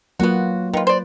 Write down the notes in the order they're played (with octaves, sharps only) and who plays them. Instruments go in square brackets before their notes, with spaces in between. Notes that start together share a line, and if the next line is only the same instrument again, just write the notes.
[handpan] F#3 A#3 F4 [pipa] B3 F#4
[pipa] D#3 F4 [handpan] B4
[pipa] C5 D5